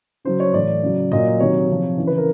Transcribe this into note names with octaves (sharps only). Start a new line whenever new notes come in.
C#3 F#3 C5
C#5
A2 E3 D5
C#3 F#3
A#2 F#3 D#5
C3 D#3 F#3 C#5
C3 F3
C#3 E3
B4
A#4